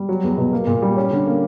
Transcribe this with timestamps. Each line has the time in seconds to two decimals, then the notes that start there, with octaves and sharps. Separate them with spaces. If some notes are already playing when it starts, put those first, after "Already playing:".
Already playing: G3
0.09 F#3
0.23 E2
0.38 B2
0.52 A#3
0.67 A#2
0.82 G3
0.97 C#4
1.11 D3
1.26 A#3